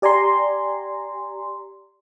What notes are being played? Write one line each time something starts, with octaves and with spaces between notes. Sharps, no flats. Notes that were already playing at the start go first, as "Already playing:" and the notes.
G4 D5 G#5 A#5 C6